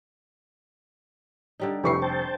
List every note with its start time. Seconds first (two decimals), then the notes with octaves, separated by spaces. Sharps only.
1.60 D3 G3 D#4
1.84 F1 E4 G4 B4 C#6 C7
2.02 C5 G5 A5